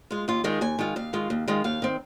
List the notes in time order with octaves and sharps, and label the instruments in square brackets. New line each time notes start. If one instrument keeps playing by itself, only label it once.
[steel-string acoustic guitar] G#3 F4
D#2 F4
D#3 G#3 F4 G#4
D#2 G#5
D#3 G#3 F4
D#2 F5
D#3 G#3 F4
D#2
D#3 G#3 F4
D#2 F5
D#3 C4